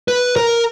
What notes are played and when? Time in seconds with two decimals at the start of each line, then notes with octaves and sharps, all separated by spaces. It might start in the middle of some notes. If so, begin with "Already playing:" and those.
0.08 B4
0.36 A#4